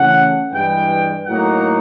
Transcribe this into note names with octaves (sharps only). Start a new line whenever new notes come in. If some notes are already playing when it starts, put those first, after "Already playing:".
Already playing: C#3 E3 A3 C#4 F#5
G2 E3 G#3 G5
A2 F#3 A#3 D#4 F#5